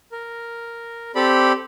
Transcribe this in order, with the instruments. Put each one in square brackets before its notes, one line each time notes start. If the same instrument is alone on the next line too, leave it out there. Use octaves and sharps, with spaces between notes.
[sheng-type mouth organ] A#4
C4 G4 A4 D5 B5